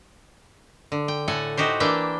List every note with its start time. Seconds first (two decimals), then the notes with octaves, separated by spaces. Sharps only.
0.92 D3
1.08 G5
1.28 A2 A4 F#5 G#5
1.57 D#4 F#4 G4 C5
1.80 E3 A#3 D4 G4 E5 G5